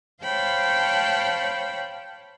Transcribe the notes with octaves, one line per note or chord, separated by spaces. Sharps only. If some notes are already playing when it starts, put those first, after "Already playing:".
C5 C#5 F5 G5 A5 B5